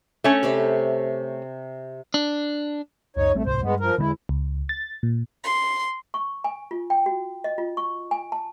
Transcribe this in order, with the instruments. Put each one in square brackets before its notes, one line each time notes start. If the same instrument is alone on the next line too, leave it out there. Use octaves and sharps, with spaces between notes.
[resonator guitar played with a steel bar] A3 C#4 [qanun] E5
[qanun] C3 D5 B5
[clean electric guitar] D4
[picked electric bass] C#2 F#2 [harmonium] D#4 C#5
[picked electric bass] A#1 G3 C4 [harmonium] A3
[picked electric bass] D1 C2 G#2 [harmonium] C5
[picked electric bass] G2 [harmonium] G#3 B3
[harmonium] F3 A#4
[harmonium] E2 E4 [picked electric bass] D3 F#3 G#3
[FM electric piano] C#2
A6
A#2
[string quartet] C6
[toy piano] C#6
G#5
F4
G5
F#4
D#5
F4
C#6
G#5
A5